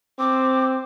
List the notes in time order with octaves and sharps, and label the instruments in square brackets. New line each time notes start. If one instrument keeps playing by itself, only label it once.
[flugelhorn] C4 [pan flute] D6